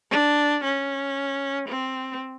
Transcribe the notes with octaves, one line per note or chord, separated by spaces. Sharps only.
D4
C#4
C4